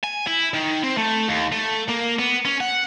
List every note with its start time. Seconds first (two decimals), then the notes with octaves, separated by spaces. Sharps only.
0.04 G#5
0.27 E4
0.54 D#3
0.84 C4
0.98 A3
1.29 D#2
1.52 A3
1.89 A#3
2.19 B3
2.45 C#4
2.60 F#5